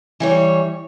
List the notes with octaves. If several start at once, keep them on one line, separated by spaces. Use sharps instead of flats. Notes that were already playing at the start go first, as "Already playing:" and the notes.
E3 G3 C#5